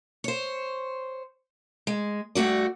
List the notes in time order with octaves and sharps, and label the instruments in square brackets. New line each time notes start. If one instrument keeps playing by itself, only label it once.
[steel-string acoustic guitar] C5 C#5
G#3
G2 A3 F#4 D5